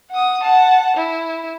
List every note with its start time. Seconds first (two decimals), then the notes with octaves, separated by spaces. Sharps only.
0.11 F#5 D#6
0.43 F#5 A5
0.97 E4